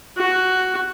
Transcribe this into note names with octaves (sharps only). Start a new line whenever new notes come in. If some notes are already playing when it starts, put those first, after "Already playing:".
F#4